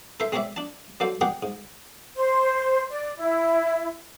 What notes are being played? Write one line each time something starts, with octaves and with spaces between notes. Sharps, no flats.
A4 A#4 C5 E5
G#3 C4 A#4 C#5 D5 E5
D4 A5
F#3 A#3 A4 C5 D5
G4 G#4 A#4 D5 F#5 G5
G#2
C5
D5
E4